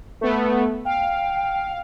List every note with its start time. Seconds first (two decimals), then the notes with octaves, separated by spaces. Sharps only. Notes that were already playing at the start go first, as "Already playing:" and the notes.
0.21 A3 B3
0.85 F5 G5